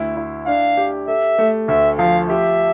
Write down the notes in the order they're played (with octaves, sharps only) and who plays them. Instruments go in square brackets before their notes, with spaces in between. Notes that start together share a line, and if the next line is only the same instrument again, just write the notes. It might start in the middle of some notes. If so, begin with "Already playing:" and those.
Already playing: [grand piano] D2 E4
E4
[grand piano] D4 [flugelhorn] F5
[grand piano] G4
[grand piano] A4 [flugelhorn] E5
[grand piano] A3
[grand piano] D2 [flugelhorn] E5
[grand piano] F3 [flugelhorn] F5
[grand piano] G4 [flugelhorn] E5